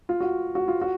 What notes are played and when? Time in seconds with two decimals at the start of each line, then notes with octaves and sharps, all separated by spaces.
0.09 F4
0.20 F#4
0.55 F#4
0.68 F4
0.81 F#4